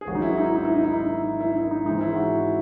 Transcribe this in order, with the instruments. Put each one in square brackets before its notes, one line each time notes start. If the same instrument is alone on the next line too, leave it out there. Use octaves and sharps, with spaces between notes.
[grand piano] G#4
G#1 G#2 F#3 C#4 F#4
D#4
E4
D#4
E4
D#4
E4
D#4
E4
D#4
E4
E4
D#4
G#2 E3 G#3 C4 D#4
E4
F#4